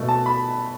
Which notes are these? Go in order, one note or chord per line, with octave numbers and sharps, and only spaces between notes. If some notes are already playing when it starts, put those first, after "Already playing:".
Already playing: B2 A3
A5
B5